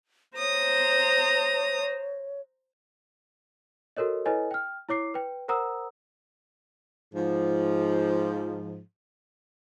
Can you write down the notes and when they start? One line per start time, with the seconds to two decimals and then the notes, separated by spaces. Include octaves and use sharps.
0.38 C5 C#5 A#5 D#6
3.97 F#4 A4 A#4 C#5 D#5
4.26 E4 A4 B4 C#5 D#5 G#5
4.51 G5 F6
4.89 E4 C#5 D6 C7
5.14 B4 G5
5.48 A#4 C5 F#5 A#5 D#6 E6
7.14 G#2 F3